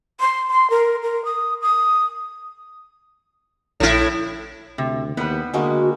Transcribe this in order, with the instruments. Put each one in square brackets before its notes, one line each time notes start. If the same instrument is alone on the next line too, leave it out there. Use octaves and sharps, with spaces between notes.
[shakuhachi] C6
C6
A#4
A#4
D#6
D#6
[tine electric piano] A#1 [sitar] A2 E4
[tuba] D2 [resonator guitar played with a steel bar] C3
[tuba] D#2 [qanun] G3 C5 [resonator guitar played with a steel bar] B3 B4
[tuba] D3 [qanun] G3 G#3 A#3 [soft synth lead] F#4